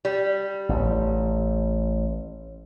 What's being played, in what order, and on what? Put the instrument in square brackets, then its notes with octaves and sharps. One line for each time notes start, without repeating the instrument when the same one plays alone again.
[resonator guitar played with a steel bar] G3
[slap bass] A1